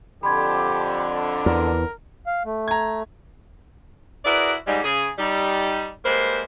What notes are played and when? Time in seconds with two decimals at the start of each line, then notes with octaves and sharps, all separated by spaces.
0.23 F2 D3 G4 B5 C6 G#6
1.46 E2 A#4
2.27 F5
2.45 A3
2.68 A#5 G#6
4.25 E4 F#4 G#4 A#4 B4 D5
4.67 G#2 G3
4.84 C#3 G#4
5.18 G3 D#4
6.05 G3 G#3 A#3 B4 C5